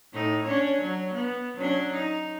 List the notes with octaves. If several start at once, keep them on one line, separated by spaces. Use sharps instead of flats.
A2 A3 D#4
C#4 D4 C#5
F#3
B3
F#3 C#4 D4
D#4